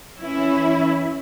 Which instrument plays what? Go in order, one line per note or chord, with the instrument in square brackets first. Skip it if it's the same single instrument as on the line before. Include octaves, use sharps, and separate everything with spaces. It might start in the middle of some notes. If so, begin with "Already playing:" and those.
[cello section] E3 C#4 E4